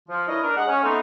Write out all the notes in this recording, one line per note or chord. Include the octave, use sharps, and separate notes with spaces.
F3
D4 E4 A#4 B4 C#5 D#5
D4 A#4
G#3 D#5 F#5
C#4
A3 B3 C4 D#4